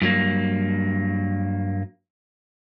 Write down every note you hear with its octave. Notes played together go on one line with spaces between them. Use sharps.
G2 F#3 A#3